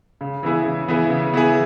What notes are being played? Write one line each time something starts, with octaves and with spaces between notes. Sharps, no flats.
C#3
E3 B3 E4 G#4
C#3
E3 B3 E4 G#4
C#3
E3 B3 E4 G#4